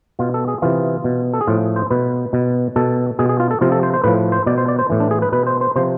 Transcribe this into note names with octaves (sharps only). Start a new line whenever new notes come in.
B2 F4
A4
G#4
C3 E3 F4
B2
A4
G#4
A2 F3 F4
C5
B2 B4
B2
B2 A4
B2 G#4
G#4
F4
A4
C3 F3 F4
A4
C5
C5
A2 F3 B4
C5
B2 D5
C5
D5
C5
A2 E3
D4
G#4
B4
B2 B4
C5
C5
C3 F3 C5